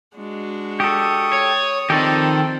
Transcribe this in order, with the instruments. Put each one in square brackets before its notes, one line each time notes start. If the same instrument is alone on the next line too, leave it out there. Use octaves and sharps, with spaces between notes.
[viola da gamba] G#3 D4 F#4
[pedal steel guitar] G4 A4 [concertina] C#6 D#6
[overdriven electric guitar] C#5
[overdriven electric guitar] D#3 [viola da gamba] F3 C4 [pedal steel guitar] G4 A4 D5